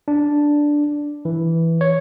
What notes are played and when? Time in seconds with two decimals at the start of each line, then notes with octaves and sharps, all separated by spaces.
0.08 D4
1.25 E3
1.81 C#5